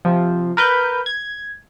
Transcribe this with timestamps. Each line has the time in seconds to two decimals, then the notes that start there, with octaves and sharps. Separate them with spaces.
0.05 C3 F3
0.57 A#4 B4 G6
1.06 G#6